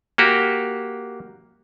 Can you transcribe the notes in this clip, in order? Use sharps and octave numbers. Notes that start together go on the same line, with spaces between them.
A#3 F#4 G4